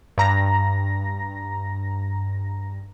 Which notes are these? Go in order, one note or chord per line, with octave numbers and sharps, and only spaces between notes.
G2 A#5 A#6